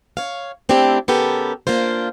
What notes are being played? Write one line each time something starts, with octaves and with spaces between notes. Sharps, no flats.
C#5 F5
A3 C4 D4 E4 G4
C#3 B3 G4 A4 A#4
A#3 D4 F4 C5